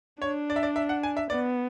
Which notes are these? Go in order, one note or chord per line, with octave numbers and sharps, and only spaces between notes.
D4 C#5
D5
E5
D5
E5
F#5
G#5
E5
B3 D5